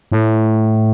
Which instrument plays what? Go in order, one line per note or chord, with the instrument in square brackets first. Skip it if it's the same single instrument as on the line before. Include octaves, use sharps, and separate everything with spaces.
[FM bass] A2